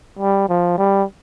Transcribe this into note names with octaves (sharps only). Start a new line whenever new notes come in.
G3
F3
G3